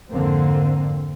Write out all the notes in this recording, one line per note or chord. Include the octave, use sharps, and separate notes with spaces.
F2 G#2 D3 A#3 C4